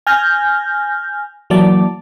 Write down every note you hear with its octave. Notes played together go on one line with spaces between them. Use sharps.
G#5 F6 G6 A#6
E3 F#3 A#3 D5 A5